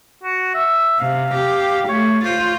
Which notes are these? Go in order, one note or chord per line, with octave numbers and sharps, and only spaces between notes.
F#4
E5
C3 F5
G4
A3 C#5
F4 C5